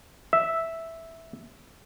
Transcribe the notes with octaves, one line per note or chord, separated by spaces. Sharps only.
E5